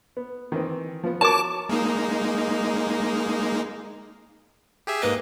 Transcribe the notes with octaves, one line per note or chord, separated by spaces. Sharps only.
B3
D#3 E3 C4
F3 B3
F#4 A#4 C#5 A5 D6
G#3 A#3 D#4
G4 G#4 E5
G#2 A#3 B4 D#5